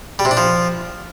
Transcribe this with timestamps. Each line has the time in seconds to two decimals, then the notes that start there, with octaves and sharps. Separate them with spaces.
0.19 G3
0.25 C3
0.31 D4
0.37 F3